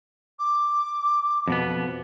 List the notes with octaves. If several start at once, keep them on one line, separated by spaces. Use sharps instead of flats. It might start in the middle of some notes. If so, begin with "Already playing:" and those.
D6
F2 B2 B3